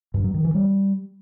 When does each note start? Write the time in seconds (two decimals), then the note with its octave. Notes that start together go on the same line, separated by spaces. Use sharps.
0.14 G2
0.24 F#3
0.34 D#3
0.44 E3
0.55 G3